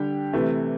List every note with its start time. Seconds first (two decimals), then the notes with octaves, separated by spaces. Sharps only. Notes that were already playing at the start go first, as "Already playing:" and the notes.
Already playing: D3 G3 D4 G4
0.33 C3 E3 A3